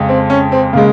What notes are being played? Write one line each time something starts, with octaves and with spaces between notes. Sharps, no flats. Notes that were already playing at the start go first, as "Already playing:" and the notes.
Already playing: F2 C#3 G#3
C4
C#4
C4
C#3 G#3 A#3